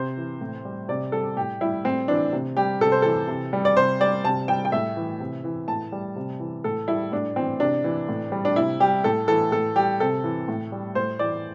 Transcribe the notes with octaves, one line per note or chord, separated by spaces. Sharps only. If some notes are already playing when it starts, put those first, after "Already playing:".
Already playing: C3 C5
E3
A2
G3
C3 D5
G3 A4
A2 G4
G3 E4
A2 C4
E3 D4
C3
G3 G4
C3 A4
C5
E3 A4
C3
G3
D5
C3 C5
G3 D5
C3 A5
G3 G5
G5
A2 E5
E3
C3
E3
A2 A5
G3
C3
E3
A2 A4
G3 E4
A2 D4
E3 C4
C3 D4
E3
A2
G3
D4
C3 E4
G3 G4
A2 A4
E3 A4
A2 A4
G3 G4
C3 A4
E3
A2
G3
A2 C5
E3 D5